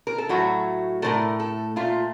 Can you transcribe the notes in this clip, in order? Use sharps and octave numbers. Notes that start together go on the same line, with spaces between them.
A#4
A4
A2 F#3 A3 F#4
A2 F3 A3 A#4
A4
A#2 A3 F4